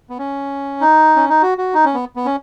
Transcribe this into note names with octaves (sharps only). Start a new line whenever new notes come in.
B3
C#4
D#4
C#4
D#4
F#4
F#4
D#4
C#4
B3
B3
C#4